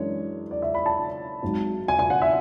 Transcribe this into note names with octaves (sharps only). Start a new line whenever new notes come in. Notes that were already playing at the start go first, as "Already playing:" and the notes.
Already playing: F#2 E3 G#3 D4 C#5
D5
E5
B5
A5
G#1 G#2 F#3
G#5
G#5
F#5
E5